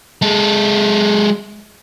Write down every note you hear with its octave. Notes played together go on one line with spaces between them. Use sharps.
G#3 A4